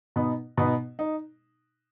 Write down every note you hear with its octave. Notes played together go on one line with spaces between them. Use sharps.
B2 B3 D#4
B2 B3 D#4
D#4